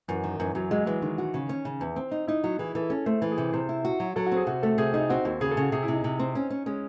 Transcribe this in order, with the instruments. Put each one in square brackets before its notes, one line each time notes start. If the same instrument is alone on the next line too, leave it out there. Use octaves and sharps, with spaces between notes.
[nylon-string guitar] F#2 [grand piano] E3
[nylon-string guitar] D#3
[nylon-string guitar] F#2 [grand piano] E3
[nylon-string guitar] F#2 [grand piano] F#3
[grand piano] F#3 [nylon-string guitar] G#3
[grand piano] E3 [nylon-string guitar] G#3
[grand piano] D#3 [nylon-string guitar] G#3
[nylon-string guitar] F#4
C#3
C#4
C#3
E2
C4
D#4
[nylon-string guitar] D#4 [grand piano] E4
[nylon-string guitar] F#3 [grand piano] F#4
[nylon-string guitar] E3 [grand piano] G#4
[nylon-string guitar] E3 [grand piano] A4
[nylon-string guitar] C#4 [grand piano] A4
[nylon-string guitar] A3 [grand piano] C5
[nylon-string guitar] E3 [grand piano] A4
[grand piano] G#4
[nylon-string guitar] C3
[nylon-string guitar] C3 [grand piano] C5
[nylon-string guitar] E4
F#4
F#3
[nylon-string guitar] F#3 [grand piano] A4
[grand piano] F#4
[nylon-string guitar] C4
[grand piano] G#4
[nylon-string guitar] C3 [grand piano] F#4
[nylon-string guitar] A3 [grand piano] A4
[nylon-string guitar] C3 [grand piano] G#4
[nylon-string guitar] D#4 [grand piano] G#4
[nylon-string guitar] C4 [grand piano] F#4
[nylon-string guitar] D#2 [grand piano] F#4
[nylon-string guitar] C#3 [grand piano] G#4
[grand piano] A4
[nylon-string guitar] C#3 [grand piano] F#4
[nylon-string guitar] C3 [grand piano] G#4
[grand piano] E4
[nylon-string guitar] C3
[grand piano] D#4
[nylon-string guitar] C3
C4
C#4
C#4
[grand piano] G#3 [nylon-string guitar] C#4